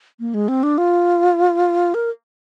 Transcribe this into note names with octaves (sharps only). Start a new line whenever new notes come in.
A#3
G#3
C4
D4
F4
A#4